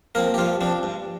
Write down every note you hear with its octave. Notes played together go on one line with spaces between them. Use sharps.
F3 A#3 C4 A#4
G4
G2 F3 F4
F3 C4 D4
G2